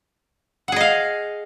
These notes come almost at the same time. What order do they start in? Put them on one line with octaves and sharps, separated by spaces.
F#5 G#4 D#5 F5